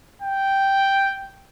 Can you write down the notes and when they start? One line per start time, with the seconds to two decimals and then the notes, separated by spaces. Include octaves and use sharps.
0.22 G5